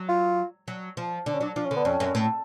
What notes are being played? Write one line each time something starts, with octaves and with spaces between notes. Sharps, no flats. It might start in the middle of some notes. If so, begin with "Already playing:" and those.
Already playing: F#3
F4
F#3
F3
D3 D4
C#4
F#3 D4
F3 D4
C#4
D3
B3
F2 C#4
F#2
A2